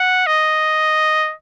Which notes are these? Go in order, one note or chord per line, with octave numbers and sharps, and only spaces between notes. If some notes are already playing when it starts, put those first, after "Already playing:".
Already playing: F#5
D#5